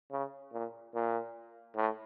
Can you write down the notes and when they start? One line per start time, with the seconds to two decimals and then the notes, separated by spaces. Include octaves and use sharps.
0.12 C#3
0.53 A#2
0.94 A#2
1.76 A2